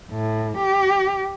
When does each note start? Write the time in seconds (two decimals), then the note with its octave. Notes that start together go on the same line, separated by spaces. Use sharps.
0.11 A2
0.58 G4